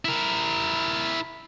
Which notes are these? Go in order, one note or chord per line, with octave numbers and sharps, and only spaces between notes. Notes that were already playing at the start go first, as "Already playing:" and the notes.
E4 A#4